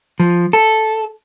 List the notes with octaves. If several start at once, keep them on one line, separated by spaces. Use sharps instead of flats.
F3
A4